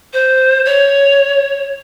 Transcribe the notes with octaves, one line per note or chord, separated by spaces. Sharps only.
C5
C#5